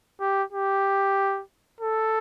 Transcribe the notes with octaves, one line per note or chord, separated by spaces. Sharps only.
G4
G4
A4